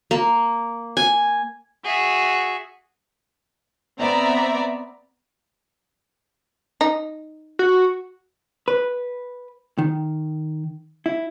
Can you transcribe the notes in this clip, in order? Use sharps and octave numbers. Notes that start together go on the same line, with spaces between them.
A#3
G#5
F#4 G#4 E5
B3 C4 D5 E5 A#5 B5
D#4
F#4
B4
D#3
E4